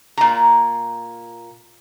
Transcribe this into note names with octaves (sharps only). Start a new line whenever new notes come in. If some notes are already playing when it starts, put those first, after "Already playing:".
A#2 A#5